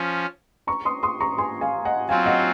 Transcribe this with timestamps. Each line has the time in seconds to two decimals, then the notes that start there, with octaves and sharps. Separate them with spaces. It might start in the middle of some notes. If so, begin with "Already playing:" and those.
Already playing: F3 C#4
0.67 A#5 C#6
0.85 C6 D#6
1.03 C6 D#6
1.20 A#5 C#6
1.38 G#5 C6
1.61 F5 G#5
1.85 D#5 F#5
2.09 F#3 C4 F4 F5 G#5
2.26 D#5 F#5